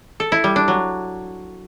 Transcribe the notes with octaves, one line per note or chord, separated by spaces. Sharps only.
A4
E4
G3
D4
F#3